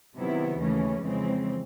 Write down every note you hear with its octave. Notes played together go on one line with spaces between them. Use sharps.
C3 D#3 F#3 B3 E4
D#2 C#3 E3 A3 C#4
F2 C#3 E3 G#3 C4